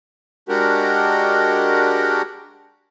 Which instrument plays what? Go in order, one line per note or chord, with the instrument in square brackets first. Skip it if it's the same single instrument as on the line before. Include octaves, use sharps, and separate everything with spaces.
[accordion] G#3 D4 F#4 G4 A#4